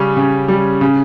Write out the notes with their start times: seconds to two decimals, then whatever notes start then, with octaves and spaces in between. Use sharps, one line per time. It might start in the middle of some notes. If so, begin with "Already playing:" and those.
Already playing: C#3 G3 C#4
0.17 C#3
0.48 G3
0.81 C#3